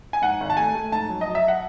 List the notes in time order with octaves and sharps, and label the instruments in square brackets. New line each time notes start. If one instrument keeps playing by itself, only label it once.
[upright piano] G#5
G#2 F#5
G#1
A5
A3 G#5
A3
G#2 A5
F#3
D#5
F#3
E5
F#5